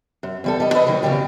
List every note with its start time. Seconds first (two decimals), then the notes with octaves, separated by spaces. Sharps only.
0.23 F#2
0.44 E2 G3 A4
0.60 G3 D#5
0.74 A4 B4 D#5
0.87 D#2 A#2 D#3 F#3
1.03 E2 C#3 F#3 G3 G4